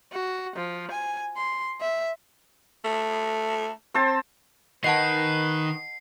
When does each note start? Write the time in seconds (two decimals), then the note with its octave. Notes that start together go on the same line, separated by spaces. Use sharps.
0.13 F#4
0.56 F3
0.91 G#5
1.37 C6
1.81 E5
2.85 A3
3.94 C4 C5 A5
4.84 D#3 B4 D#5 F#5 A5 C7